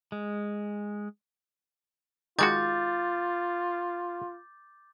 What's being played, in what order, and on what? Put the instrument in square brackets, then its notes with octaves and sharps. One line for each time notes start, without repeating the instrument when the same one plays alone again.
[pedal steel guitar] G#3
[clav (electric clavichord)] D#3 G#3 F#4 [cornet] F4 [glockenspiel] D6 G6 A6